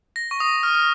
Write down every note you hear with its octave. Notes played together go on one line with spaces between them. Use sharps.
A#6
C#6
D#6
F6
F6